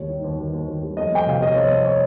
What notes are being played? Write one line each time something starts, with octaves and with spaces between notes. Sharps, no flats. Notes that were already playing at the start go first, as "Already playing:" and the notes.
Already playing: D#2 G3 C#5
D#3
D#2
D#2
D#2
D#2
G3
F2 D#5
F2 G5
C3 F5
C3 D#5
F2 C#5
F2
C#5